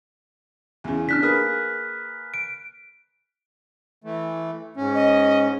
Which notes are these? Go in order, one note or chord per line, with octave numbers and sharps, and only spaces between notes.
E2 C#3
D4 F6 F#6 B6
A#3 G#4 B4
D7
E3 A3
G#2 C#4
D#5